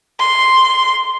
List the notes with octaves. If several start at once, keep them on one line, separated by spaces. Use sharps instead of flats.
C6